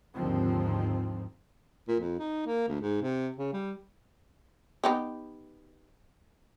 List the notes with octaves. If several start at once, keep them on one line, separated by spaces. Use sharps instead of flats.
D#2 G#2 D3 D#3 F3 C4
A#2
F2
D#4
A#3
D2
G#2
C3
C#3
G3
B3 D#4 G4